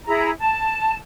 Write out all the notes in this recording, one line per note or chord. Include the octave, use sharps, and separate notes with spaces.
E4 G#4 A#5
A5